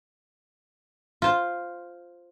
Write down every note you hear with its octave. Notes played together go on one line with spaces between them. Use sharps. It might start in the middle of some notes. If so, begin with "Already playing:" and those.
F4 C5